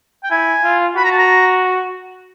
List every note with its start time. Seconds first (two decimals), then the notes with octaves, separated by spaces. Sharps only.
0.24 G5
0.31 E4 G#5
0.64 F4
0.96 F#4 B5
1.04 A#5
1.11 A5
1.18 A#5